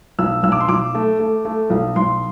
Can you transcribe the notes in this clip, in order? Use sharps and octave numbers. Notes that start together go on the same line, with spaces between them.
B1 E6
B1 E6
D6
C6
B1 D6
A3
A3
A3
B1
B1 C6